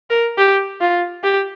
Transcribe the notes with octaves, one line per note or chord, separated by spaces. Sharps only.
A#4
G4
F4
G4